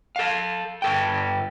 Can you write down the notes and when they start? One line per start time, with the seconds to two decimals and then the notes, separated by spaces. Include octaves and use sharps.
0.16 A4 F5
0.82 G2 A4 G5